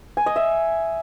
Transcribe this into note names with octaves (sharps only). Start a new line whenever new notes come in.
G#5
D#5
E5